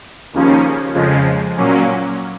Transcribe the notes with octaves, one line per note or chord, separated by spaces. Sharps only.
D#2 C#3 F3 A#3 C#4
F2 C#3 F3 G#3
A#2 F#3 A#3 C#4